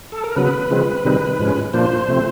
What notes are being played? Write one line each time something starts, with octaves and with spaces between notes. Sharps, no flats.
A4
A#4
C#3 F#3 B3 B4
C#3 F3 G#3 C4
C3 D#3 G3 C4 D#4
G#2 F3 G#3 C#4
A#2 F3 A#3 D4 C5
C3 F3 A3 C4